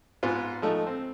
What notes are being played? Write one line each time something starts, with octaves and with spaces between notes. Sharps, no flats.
G#2 B3 F4
F3 A3 D#4
C4